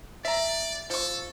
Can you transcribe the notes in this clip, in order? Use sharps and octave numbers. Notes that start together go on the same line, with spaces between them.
D5 E5 A#5
F3 A4 C#6